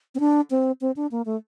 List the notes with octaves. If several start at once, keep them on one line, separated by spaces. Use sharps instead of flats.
C4
D4
C4
C4
D4
A#3
A3